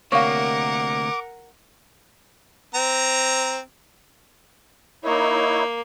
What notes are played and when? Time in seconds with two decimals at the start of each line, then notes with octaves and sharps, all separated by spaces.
0.12 D2 C3 A#3 A#4 C#5 F5 F#5 D6
2.74 C4 A#5
5.04 A#3 D#4 E4 C#5